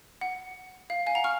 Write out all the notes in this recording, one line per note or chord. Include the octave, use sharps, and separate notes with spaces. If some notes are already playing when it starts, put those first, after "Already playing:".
F#5
F5
F5 G#5
F#5 A#5
C#6 F6